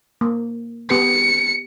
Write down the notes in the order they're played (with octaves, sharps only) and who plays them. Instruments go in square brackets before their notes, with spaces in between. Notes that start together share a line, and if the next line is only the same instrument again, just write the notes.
[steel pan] A#3
[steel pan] B3 G4 B4 [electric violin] C#7